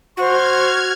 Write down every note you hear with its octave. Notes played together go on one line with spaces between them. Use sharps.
F#4 C5 C#6 F6 G#6